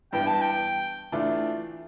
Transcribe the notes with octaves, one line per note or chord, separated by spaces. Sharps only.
G2 E3 B3 G5
A5
G5
E3 A3 D4 F4